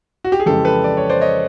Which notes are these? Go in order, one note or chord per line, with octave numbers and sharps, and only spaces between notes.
F#4
G4
G#4
F2 C#3 E3 G#3 G4 A4
A4 B4
D5
C#5
C5 D5
C#5 D#5